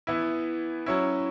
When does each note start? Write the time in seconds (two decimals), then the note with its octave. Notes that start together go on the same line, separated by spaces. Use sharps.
0.07 E3 B3 E4
0.86 F#3 C#4 E4